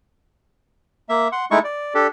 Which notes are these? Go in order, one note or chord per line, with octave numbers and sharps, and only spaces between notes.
A#3 E5
F#5 C6
G#3 A3 D#4 E4 C#6
D5
D4 G4 A4